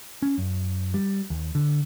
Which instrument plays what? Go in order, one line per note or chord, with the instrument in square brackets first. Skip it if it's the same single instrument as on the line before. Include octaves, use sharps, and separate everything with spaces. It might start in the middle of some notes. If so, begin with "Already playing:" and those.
[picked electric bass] C#4
F#2
G3
D#2
D3